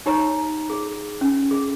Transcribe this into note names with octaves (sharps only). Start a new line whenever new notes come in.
D#4 G4 C#5 A#5
G#4
C#4
G#4